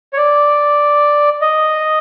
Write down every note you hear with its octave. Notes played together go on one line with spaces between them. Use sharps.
C#5
D5
D#5